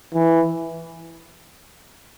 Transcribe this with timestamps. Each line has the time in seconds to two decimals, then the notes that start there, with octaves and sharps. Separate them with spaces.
0.14 E3